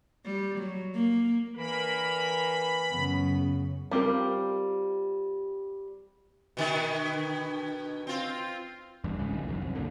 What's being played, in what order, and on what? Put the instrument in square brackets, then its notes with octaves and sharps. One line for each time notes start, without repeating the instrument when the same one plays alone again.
[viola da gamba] G3
F#3
A#3
[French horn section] D3 A#3 A#4 [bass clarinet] E3 [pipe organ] B5
[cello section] F#2 C#3 [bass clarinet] B3
[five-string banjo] G3 C4 F4 A#4
[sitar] B2 D3 D#3
C4 F4
[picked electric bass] E2 G2
C#2 G#2 C#3
B1 D#3 F3
E1 F#2
C2
F#2 A#2 D3